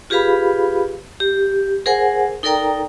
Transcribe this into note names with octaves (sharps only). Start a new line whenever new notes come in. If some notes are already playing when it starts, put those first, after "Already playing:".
F4 G4 G#4 B4 F5 B5
G4
G#4 A#4 C5 F#5 G#5
D#4 A4 A#4 D5 G5 A#5